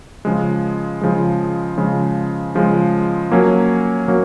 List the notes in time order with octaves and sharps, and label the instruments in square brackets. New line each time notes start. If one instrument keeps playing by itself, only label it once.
[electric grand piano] C#3 F3 G#3
C#3 F3 G#3
C#3 F3 G#3
C#3 F3 G#3
F#3 A#3 C#4
F#3 A#3 C#4